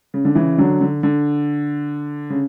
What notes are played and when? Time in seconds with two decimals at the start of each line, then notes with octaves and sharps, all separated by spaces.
0.14 C#3
0.25 D3
0.35 C#3 E3
0.58 D3 F#3
0.81 D3
1.03 D3
2.30 C#3